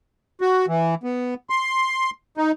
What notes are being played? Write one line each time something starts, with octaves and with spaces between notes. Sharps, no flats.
F#4
E3
B3
C6
D#4